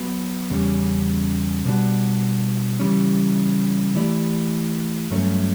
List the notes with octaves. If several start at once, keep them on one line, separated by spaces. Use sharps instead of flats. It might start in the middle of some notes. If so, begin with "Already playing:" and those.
Already playing: F#3 B3 F#4
E2 C#3 G3 C#4
B2 G3 D4 F#4
C#3 E3 G3 C#4
E3 A3 E4 G4 D5
G2 F#3 A3 C#4